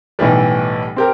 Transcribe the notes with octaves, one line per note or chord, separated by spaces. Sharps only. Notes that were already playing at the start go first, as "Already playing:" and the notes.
B1 A2 E3 G3
C4 G4 A#4